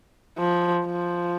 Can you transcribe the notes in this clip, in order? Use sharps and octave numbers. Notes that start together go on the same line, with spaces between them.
F3
F3